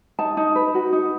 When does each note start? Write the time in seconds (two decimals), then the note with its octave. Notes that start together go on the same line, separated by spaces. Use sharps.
0.19 D#4 A5
0.37 D#4
0.55 B4
0.74 F#4
0.93 D#4